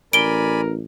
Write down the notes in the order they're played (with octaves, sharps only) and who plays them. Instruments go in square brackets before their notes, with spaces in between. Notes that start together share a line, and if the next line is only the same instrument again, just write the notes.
[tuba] A1 [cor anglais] A#4 [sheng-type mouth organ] D5 G#5 B5 [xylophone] D7 G7